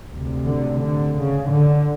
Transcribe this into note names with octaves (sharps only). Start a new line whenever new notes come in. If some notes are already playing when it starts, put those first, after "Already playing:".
D2 C3
D3
D3
C#3
D3